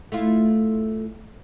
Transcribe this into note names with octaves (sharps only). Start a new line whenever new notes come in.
A3 E4 F4